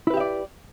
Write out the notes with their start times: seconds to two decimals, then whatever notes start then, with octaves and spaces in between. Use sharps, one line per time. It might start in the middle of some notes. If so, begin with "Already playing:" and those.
0.07 E4
0.10 B4
0.14 G4
0.17 E5
0.20 D5